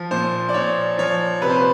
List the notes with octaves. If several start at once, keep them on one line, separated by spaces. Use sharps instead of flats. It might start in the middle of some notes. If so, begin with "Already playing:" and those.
Already playing: F3
A#2 C5
D5
A#2 C#5
F3 C#5
C3 B4
C5
B4